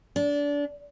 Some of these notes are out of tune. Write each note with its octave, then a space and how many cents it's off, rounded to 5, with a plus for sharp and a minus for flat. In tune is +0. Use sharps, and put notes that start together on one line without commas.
D4 -25